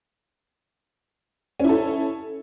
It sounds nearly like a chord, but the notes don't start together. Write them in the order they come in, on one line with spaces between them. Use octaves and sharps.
C#4 E4 A4